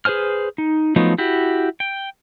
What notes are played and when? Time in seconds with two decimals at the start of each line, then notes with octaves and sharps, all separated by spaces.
0.05 G#4 B4 C5 G#5 F6
0.58 D#4
0.96 F3 F#3 A3 B3 D#4
1.18 E4 F#4 G4
1.80 G5